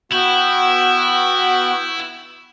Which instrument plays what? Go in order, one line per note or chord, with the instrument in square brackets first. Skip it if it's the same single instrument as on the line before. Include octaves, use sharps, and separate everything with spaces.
[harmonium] B3 F#4 G5 [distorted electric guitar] E4